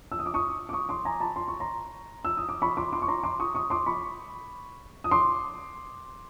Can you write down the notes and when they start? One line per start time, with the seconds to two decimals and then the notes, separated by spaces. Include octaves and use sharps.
0.12 E6
0.19 D#6
0.26 D6
0.34 C#6 D#6
0.69 D6
0.73 C#6 D#6
0.89 C6 D6
1.05 G#5 A#5
1.20 A5 B5
1.36 C6
1.48 C#6
1.60 A#5 C6
2.25 E6
2.37 D#6
2.49 D6
2.62 B5 C#6
2.77 C6 D6
2.93 C6 D6
3.02 C#6
3.08 A#5 C6
3.23 C6 D6
3.40 C#6 D#6
3.55 C#6 D#6
3.70 C6 D6
3.86 B5 C#6
5.04 D#6
5.11 C6 D6